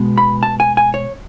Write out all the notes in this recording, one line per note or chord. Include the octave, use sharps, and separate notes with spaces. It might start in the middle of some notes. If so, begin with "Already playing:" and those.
Already playing: B2 G#3 B3
B5
A5
G#5
G#5
C#5